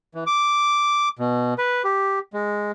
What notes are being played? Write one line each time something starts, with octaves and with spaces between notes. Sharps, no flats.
E3
D6
B2
B4
G4
G#3